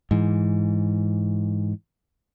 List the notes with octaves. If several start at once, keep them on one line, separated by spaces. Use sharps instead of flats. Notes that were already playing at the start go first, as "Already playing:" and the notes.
G#2 E3